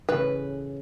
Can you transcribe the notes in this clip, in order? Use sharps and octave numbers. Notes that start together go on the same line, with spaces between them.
A2 C#3 E3 B4